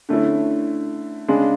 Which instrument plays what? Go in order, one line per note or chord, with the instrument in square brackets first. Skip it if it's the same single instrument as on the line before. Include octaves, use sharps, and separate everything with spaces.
[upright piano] D3 A3 C#4 E4
C#3 G#3 D4